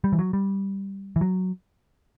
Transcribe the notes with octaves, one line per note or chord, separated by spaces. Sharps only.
G3
E3
F#3
G3
E3
F#3